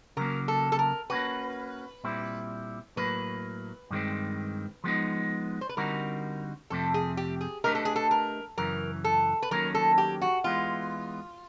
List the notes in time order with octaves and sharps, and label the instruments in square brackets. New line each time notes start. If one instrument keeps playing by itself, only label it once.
[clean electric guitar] C#3 F#3 A#3 [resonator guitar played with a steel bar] A#4
[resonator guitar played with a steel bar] A4
A4
A#4
[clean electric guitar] A#3 C#4 F#4 [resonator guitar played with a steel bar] B4
[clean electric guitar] A#2 G3 C4 E4
[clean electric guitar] A2 F#3 A#3 [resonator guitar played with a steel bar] B4
[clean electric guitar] G2 D#3 G#3 C4
F3 G#3 B3 D#4
[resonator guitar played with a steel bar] C5
B4
[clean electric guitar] D3 G3 C4 D#4 F#4 [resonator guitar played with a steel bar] A#4
[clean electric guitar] F2 C3 F3 A3 C4 [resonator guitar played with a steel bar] A4
[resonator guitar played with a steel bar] G#4
G4
G#4
[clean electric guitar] A3 D4 G4 B4 D#5 [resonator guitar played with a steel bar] A#4
[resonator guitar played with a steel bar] A4
G#4
A4
A#4
[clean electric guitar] F#2 C#3 E3 [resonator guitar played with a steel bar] A#4
[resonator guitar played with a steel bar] A4
B4
[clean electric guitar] D#3 F#3 A#3 C#4 [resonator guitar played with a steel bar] A#4
[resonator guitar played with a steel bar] A4
G4
F#4
[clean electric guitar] E3 G#3 B3 [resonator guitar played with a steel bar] F4